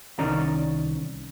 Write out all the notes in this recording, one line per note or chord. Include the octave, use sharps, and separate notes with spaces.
C2 D#3 C#4 D5 D#5 A#5